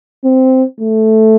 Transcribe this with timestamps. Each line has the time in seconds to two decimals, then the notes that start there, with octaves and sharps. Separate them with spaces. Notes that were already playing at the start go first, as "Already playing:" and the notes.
0.24 C4
0.80 A3